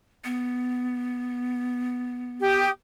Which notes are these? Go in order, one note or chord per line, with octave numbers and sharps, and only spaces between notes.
B3
G4 D#6